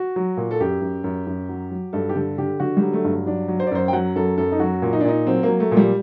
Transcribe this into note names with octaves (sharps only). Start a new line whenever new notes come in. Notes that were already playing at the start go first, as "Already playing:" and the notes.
Already playing: F#4
F#3
A#2
A4
F#2 G4
F#2
F#2
F#2
F#3
F#3
G2 A4
G4
D3 A4
D3 G4
D3 F#4
G3
F#3
A3
G2
F#3 D4
F#3
C5
D5
F#2 C5
G5
F#3 F#5
F#2 A4
F#2 A4
D#4
F#3 F#4
A#2
D#4
D4
A#2 D#4
F#3 C4
A#3
F#3
A3
A#2
G3